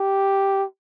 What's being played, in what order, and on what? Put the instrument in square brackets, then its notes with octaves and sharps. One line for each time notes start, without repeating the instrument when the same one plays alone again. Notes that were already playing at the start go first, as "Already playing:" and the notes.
Already playing: [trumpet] G4